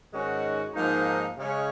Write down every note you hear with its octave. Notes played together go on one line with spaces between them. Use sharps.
G#2 D#3 G#3 C#4 F#4
G#2 F3 A#3 D#4
C#3 G#3 C#4